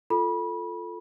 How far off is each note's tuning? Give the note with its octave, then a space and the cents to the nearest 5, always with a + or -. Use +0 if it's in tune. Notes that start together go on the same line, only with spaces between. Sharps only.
F4 +0 A4 +0 B5 -30